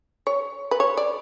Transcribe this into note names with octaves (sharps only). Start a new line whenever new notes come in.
C#5
B4
C#5
D5